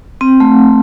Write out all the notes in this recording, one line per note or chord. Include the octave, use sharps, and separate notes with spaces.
C4
A3